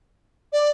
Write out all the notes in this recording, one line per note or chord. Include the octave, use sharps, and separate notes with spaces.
D5